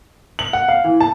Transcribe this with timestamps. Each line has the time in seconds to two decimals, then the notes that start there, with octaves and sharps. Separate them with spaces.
0.39 F#7
0.53 F#5
0.68 F5
0.84 E3
1.01 A5